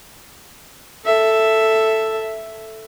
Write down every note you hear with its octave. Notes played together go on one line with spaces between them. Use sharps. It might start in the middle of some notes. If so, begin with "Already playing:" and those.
A4 E5